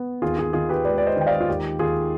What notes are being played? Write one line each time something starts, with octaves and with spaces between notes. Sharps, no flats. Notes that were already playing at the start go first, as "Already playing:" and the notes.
Already playing: B3
D#2 F4 G#4
F4 G#4
D#3 F4 G#4
G4 B4
G#3 B4 D5
D5
C5 D#5
D#3 G5
D5 F5
F4
D#2 G4
D#2 F4 G#4